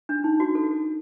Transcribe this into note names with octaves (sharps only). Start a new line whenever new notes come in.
D4
D#4
F#4
A4